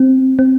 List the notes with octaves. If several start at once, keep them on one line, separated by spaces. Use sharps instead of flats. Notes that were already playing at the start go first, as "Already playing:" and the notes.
Already playing: C4
C4